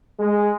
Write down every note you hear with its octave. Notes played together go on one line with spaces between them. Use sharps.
G#3